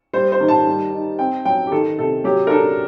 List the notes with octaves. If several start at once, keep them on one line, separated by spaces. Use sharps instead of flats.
G3 C5
C5
D#3
A5
G3
D#4
C4 G5
F#3 G5
G4
D#3 A4
C3 A4
F#3 G4
A#4
D4 A4